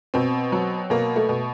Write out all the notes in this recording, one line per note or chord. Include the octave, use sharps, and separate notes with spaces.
B2 C4
F#3
B2 A#3
A3
B2